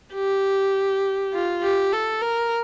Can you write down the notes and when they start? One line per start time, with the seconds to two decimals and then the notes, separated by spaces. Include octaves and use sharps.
0.14 G4
1.33 F4
1.63 G4
1.92 A4
2.22 A#4